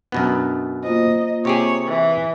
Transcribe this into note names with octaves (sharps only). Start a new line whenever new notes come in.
F#2 B2 B3 D4
A#3 F4 C5 D#5
C3 G4 G#4 C#5
E3